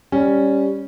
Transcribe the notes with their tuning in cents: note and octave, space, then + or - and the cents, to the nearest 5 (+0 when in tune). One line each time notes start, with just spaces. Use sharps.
G3 +10 C#4 +0